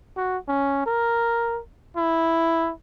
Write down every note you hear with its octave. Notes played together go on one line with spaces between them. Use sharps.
F#4
C#4
A#4
E4